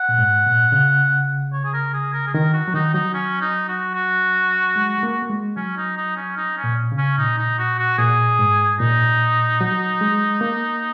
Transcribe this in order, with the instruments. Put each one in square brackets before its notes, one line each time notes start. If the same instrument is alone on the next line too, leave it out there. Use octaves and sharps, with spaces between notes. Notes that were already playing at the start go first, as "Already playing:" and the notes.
Already playing: [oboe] F#5
[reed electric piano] A#2
G#2
A#2
C#3
[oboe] C#5
G#4
A#4
G#4
A#4
G#4
[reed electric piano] D#3 [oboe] A#4
[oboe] F#4
[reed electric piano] F#3
[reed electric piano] D#3 [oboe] D#4
[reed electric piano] F#3 [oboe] D#4
[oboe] C#4
D#4
F#4
F#4
[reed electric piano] G#3
G#3
A#3
A#3
G#3
[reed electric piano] F#3 [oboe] C#4
[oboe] D#4
D#4
C#4
D#4
C#4
[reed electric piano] A#2
C#3
[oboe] C#4
[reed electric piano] A#2 [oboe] D#4
[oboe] D#4
F#4
F#4
[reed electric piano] A#2 [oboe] G#4
[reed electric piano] G#2
[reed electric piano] A#2 [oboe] D#4
[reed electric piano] F#3
G#3
A#3